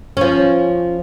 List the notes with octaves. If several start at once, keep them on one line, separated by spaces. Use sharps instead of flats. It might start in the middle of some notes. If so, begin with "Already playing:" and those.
F3 C#4